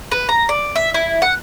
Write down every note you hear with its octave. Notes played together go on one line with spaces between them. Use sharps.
B4
A#5
D5
E5
E4
F#5